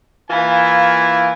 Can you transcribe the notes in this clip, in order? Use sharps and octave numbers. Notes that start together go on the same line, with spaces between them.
E3 A#3 E4 F4 G#5